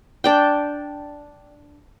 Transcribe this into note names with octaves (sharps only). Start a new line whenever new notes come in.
D4 D5 G5